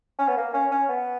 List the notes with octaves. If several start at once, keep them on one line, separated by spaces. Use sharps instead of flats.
C#4
B3
A#3
C#4
C#4
B3